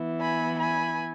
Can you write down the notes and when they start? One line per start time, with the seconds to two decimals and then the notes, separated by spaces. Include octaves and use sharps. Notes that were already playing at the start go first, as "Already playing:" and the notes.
Already playing: E3 B3 E4
0.20 G#5 B5
0.58 G#5 B5